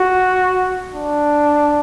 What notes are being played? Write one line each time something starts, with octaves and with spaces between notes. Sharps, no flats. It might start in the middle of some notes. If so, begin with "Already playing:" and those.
Already playing: F#4
D4